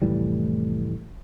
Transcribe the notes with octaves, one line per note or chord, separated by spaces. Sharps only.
F1 A2 E3 G3